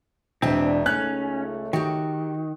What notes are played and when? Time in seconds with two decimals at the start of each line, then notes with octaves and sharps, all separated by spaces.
0.42 E1 C4 D4 D#5 E5 G#5
0.86 C#2 A3 C#4 D#4 F#6
1.73 D#3 F#4 G4